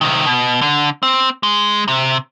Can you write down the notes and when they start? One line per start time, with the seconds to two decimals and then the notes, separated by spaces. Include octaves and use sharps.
0.01 C3 D#3
0.26 B2
0.61 D3
1.03 C4
1.43 G#3
1.88 C3